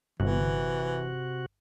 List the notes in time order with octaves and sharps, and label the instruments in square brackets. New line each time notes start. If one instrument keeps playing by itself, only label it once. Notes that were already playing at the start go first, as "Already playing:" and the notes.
[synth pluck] G1 [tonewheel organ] C3 F#4 [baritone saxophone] E3